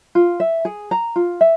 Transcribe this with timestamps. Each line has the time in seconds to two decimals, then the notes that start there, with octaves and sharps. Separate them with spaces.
0.15 F4
0.40 E5
0.65 G#4
0.91 A#5
1.16 F4
1.41 E5